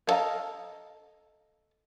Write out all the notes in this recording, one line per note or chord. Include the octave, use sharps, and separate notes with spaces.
B3 A4 D#5 F5 A#5